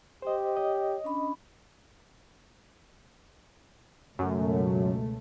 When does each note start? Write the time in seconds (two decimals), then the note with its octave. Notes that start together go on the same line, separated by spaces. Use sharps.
0.22 G4 C5 D#5
0.57 C#5 D#5
1.04 C#4 D4 B5
4.19 C#2 F#2 B2 A3